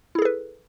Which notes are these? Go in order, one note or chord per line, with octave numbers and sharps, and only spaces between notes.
E4 G#4 A4 B4